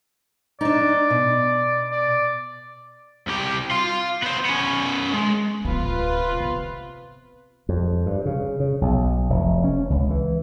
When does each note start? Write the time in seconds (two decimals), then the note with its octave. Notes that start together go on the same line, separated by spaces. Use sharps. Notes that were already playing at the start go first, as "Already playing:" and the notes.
0.61 D4 D#4 D5
1.10 B2
1.92 D5
3.27 C2 G4
3.71 F5 C6
4.22 B3 C5
4.45 B3 C#4
5.13 G#3
5.65 D1 C3 B3 F4 B4
6.40 B3
7.69 F2
8.06 G2
8.26 C#3
8.60 C#3
8.81 B1
9.30 F1
9.64 C#4
9.90 C#2
10.11 E3